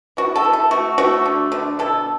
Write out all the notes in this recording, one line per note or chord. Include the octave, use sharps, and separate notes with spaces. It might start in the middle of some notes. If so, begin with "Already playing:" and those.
E3 F#4
A4
E3
A4
A3 F#4
A3 F#4
D3
D3
B2 A4